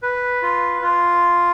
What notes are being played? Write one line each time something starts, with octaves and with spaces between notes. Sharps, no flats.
B4
F4
F4